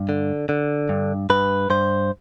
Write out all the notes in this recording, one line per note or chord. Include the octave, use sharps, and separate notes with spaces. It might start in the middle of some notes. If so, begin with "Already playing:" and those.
Already playing: G2
D3
D3
G2
G2 B4
G2 C5